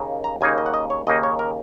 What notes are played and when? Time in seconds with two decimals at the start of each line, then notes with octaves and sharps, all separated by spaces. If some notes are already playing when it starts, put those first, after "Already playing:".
Already playing: D#2 C#3 A#3 D#4
0.24 A#5
0.41 D#2 C#3 A#3 D#4 G#5
0.58 D#5
0.66 F#5
0.74 D#5
0.90 C#5
1.07 D#2 C#3 A#3 D#4 D#5
1.23 C#5
1.39 A#4